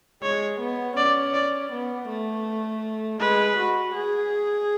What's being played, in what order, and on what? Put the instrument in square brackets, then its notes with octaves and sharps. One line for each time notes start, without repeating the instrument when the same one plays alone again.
[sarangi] G#3 [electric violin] C#5
[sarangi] B3
[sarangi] C#4 [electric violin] D5
[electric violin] D5
[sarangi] B3
A3
[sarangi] G#3 [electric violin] B4
[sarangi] F#4
G#4